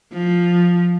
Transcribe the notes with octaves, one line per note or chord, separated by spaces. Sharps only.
F3